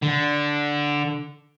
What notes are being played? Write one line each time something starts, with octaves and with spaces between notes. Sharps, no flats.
D3